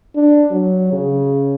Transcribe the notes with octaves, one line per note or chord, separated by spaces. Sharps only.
D4
F#3
C#3